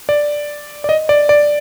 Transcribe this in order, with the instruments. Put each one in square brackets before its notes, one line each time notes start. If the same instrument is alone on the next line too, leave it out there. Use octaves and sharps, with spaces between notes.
[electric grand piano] D5
D5
D#5
D5
D5